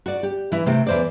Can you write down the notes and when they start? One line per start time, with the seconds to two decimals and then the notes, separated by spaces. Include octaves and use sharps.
0.06 F#4 D5
0.23 G4
0.52 E3 E4
0.66 C3 A3 C4
0.87 E2 C5 D5